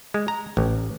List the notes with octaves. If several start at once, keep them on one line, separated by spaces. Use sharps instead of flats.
G#3
A#5
A1